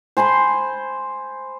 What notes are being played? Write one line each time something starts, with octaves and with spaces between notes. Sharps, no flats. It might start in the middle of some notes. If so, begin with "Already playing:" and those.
C5 G#5 B5 C6